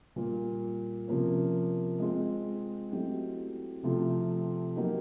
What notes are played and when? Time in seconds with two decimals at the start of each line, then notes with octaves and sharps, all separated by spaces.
0.16 A#2 G3 A#3
1.08 C3 F3 A#3 C#4
2.00 G#3 C4 F4 G#4
2.92 F#3 A3 C4 E4 G4
3.83 C3 F3 A3 C4 F4
4.76 F#3 A#3 D#4 G4